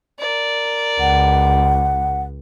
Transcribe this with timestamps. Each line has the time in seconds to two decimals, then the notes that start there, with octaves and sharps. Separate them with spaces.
0.19 A#4 D5
1.00 C#2 F#5